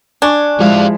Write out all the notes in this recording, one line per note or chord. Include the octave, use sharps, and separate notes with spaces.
D4 G#5 C#6
F3 G3 G#3 E4 F5